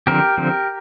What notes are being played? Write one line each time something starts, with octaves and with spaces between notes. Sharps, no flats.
D3 F3 C4 G4 A#4
D3 F3 C4